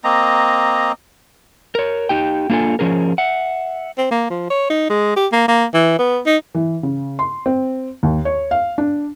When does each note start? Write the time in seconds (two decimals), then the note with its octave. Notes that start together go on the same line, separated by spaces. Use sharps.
0.04 A#3 C4 D#5 A#5
1.75 A#4 C#5
2.09 D#4 G4 G5
2.50 A#3 D4 F4 A4 G#5
2.79 F3 C#4 G#4 A#4
3.18 E5 F#5
3.98 C4
4.11 A#3
4.30 F3
4.50 C#5
4.70 D#4
4.90 G#3
5.16 G4
5.33 A#3
5.48 A#3
5.74 E3
5.99 B3
6.26 D#4
6.55 E3
6.83 C#3
7.19 C6
7.46 C4
8.03 D#2
8.25 C#5
8.51 F5
8.78 D4